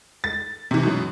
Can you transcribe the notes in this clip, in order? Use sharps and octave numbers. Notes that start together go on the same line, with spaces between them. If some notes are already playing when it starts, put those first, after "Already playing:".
A6
C3 E3
F#2 B2